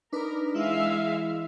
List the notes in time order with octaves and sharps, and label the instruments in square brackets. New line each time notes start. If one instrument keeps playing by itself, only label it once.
[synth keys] D4 D#4 B4 [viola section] A#4
[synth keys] E3 E4 [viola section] G#3 E5 F5